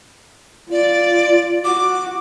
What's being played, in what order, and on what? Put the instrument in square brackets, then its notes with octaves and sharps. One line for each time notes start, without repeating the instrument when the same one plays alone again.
[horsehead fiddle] F4 [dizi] D5
[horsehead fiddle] F#4 [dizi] D6